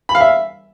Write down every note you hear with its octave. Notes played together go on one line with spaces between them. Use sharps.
B5
F5
E5